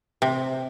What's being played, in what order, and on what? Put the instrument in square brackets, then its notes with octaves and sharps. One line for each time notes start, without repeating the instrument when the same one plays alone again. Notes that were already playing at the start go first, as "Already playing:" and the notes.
[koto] C3